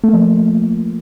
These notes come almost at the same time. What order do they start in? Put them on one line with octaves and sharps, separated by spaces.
A3 A#3 F3